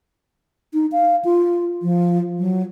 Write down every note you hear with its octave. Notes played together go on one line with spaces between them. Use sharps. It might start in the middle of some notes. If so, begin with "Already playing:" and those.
D#4
F5
F4
F3
F#3